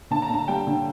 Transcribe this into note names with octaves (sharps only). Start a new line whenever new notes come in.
D3 A5
A#5
D3 A5
G3 G5
D3